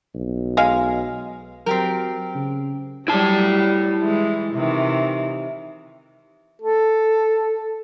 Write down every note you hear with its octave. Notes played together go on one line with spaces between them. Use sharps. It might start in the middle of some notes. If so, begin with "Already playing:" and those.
B1
G#3 F5
F#3 C4 G4 A#4
C#3
F#3 G3 E4 A5
E3 G#3
C3 D#3 E3
A4